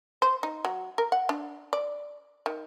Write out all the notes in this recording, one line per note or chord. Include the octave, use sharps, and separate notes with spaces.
C5
D#4
F#3
A#4
F#5
D4
D5
D#3